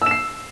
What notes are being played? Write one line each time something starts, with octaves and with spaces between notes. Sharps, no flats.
E6 C7 E7